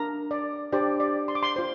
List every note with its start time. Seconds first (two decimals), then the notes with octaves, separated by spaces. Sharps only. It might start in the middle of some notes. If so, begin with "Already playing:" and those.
Already playing: D4 A#4 A#5
0.31 D5
0.72 D4 G4 C5 D5
1.00 D5
1.28 C6
1.35 D6
1.43 C6
1.56 F4 C5